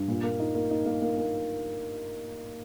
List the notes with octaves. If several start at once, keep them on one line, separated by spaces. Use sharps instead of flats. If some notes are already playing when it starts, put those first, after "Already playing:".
Already playing: G2
A#2
A#3
D#4
A#3
D#4
A#3
A#3
A#3